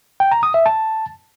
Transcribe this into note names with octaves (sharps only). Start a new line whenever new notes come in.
G5
A#5
D#6
E5
A5